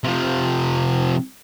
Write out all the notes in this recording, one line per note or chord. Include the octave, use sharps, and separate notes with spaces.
C3 F3